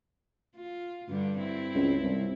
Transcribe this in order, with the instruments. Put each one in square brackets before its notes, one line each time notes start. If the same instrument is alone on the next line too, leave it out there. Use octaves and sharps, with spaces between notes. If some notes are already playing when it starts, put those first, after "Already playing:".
[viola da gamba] F4
G2 D3 G3
C4 E4
[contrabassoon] C#2
C2